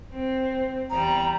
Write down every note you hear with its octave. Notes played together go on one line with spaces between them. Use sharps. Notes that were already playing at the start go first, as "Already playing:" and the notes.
C4
E2 G3 A#5